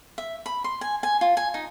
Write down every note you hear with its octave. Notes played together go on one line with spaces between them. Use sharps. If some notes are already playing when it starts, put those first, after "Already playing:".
E5
B5
C6
G#5
G#5
F4
G#5
D#4